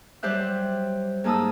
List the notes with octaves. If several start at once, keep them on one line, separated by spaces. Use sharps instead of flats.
F#3 G3 G4 C5 E5 F#6
G#2 A#3 D#4 A5 D#6 E6